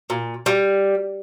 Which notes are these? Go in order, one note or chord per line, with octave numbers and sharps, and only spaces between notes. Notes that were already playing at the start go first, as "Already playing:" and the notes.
A#2
G3